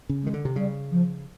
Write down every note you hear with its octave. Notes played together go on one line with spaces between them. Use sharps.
C#3
D#3 G#3
D3
C3
C#3 G3
F3